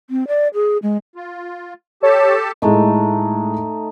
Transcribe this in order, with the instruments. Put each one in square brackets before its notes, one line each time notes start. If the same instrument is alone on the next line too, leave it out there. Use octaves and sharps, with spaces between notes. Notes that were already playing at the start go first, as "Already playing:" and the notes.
[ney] C4
D5
G#4
G#3
[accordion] F4
[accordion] G4 A4 A5 [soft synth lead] C#5
[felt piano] A2 G#3 [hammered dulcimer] A3 D#4